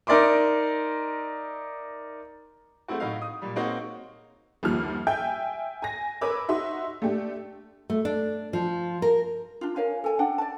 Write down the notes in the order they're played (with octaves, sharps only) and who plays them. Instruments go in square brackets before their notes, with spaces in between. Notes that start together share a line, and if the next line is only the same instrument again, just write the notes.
[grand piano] D#4 A#4 D5 E5 C6 D6
G#3 A3 C4 E4 F#4
A2 D#4 F#4 F5
D#6
A#2 G3
G#3 A#3 C4 D#4 F#4 C#5
[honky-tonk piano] G1 D#2 F3 F6
E5 G5 G#5 G6
G#5 A#6
A#4 B4 C#5 B5 D6 E6
D#4 F#4 E5 C6
A3 D4 G4
[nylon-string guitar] A3
D4
F3
A#4
[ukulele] D4 F4
A#4 C#5 F5 G#5
A4 G#5
D4 F#5 G5 A5
D5 A5